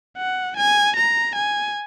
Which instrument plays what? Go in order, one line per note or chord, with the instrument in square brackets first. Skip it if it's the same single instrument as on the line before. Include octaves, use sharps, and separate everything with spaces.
[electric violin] F#5
G#5
A#5
G#5